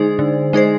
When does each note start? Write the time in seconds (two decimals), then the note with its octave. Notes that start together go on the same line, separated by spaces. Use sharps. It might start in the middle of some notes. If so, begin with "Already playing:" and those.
Already playing: D3 G#3 D#4 G#4 C5
0.19 D3
0.53 G#3 D#4 G#4 C5